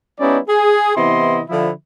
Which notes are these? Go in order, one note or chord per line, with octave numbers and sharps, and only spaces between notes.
G3 B3 C#4 D#4 E4 D5
G#4
C3 E3 B3 E4 D#5 C6
D3 F3 E4